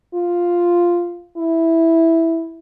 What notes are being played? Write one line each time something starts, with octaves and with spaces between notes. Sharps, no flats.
F4
E4